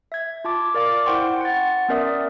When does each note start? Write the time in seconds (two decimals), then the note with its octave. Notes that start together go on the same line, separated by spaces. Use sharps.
0.12 E5 G#6
0.44 F4 A5 D6
0.74 A#4 D5 F5 D6
1.06 E4 C5 F#5 G5 C6 C#6
1.41 F#5 A6
1.88 B3 C#4 A#4 D5 E5 D#6